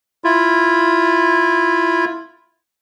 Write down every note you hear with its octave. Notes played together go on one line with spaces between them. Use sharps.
E4 F4